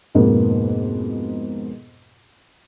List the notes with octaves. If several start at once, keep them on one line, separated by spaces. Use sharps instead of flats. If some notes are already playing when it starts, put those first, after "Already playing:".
F2 G#2 B2 A#3 B3